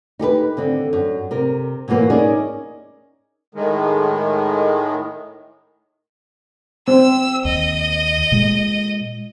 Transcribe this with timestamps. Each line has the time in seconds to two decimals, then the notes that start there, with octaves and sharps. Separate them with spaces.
0.19 D#4 G4 G#4 B4
0.57 D#2 D3 C4
0.93 F#2
1.31 C3 A#4
1.88 B2 E3 F#3 A#3 B3
2.10 C#4 D#4 G#4 A#4 D5
3.55 A2 D#3 G#3
6.88 C4 E6
7.45 D#2 D#5
8.32 A#2 G#3